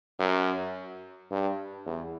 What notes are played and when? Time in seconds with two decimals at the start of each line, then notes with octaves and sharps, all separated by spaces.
0.20 F#2
1.31 G2
1.86 E2